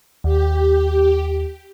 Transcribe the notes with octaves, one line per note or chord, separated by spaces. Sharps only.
D#2 G4